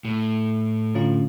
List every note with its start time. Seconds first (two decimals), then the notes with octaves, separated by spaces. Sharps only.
0.05 A2
0.95 D3 C#4 F4